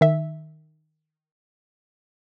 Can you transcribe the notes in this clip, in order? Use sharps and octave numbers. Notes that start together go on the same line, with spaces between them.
D#3 E5